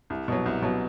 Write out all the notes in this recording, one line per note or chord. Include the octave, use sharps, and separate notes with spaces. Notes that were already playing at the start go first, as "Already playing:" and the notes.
C2
B2 F#3
C2
B2 F#3